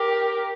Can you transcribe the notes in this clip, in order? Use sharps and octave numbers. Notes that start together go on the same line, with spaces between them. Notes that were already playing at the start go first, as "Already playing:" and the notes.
Already playing: G4 A#4